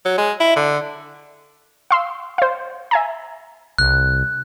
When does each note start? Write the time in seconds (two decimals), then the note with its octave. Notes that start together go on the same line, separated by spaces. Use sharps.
0.06 F#3
0.18 G#3
0.40 E4
0.56 D3
1.91 F5 C6 E6
2.38 C5 F5
2.91 E5 G#5 A#5
3.78 C2 F#6